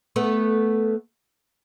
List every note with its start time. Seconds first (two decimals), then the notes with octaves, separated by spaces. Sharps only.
0.16 A3 B3